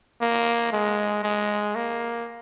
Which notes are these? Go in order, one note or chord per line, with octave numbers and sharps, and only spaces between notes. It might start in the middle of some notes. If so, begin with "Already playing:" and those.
A#3
G#3
G#3
A#3